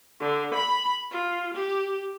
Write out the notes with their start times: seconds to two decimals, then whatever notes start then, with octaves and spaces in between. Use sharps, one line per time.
0.20 D3
0.54 B5
1.11 F4
1.54 G4